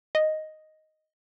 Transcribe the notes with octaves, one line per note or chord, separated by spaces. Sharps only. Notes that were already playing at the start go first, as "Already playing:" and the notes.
D#5